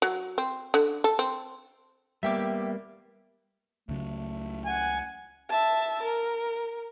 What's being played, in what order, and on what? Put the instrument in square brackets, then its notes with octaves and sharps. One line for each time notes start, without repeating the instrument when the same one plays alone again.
[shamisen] F#3
C4
D3
A4
C4
[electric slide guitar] G3 A#3 B3 [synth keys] E5 G5 D6
[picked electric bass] C#2 C#3 F#3 [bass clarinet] A3
[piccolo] F#5 [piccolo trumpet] G#5
[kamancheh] E5 A5
A#4